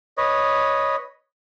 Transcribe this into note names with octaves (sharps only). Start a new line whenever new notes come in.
B4 C#5 D#5